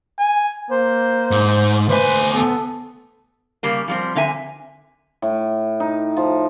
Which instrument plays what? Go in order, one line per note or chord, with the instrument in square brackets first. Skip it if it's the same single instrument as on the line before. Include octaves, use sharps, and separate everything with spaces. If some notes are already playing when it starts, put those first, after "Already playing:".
[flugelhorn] G#5
[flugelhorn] A#3 [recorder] C5
[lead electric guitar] G#2
[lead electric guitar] D2 G#5 [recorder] B4 [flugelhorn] C5
[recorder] B3 [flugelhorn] A4
[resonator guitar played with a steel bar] C#3 G3 A#3
F3 G3 C4
D3 C4 E5 G#5
[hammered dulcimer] A2
D#4
F3